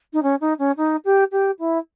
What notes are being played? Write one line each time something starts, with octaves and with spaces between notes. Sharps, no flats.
D#4
C#4
D#4
C#4
D#4
G4
G4
E4